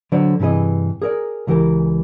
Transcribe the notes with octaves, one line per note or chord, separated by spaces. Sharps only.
D3 F#3 C5 D5
G2 C3 E3 G#4 D#5
G#4 A#4 D5
C#2 E3 G4 A#4